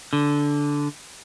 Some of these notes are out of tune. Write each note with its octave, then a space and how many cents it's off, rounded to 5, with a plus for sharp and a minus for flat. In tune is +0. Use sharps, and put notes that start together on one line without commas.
D3 -10